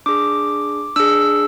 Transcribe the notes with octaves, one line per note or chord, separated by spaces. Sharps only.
D4 G#4 D6
D4 G#4 E6